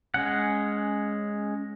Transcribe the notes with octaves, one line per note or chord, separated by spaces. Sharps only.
G#3 C#4 F#5